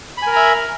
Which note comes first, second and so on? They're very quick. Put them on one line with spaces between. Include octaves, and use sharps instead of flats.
B5 G#5 A#4 A#5 E5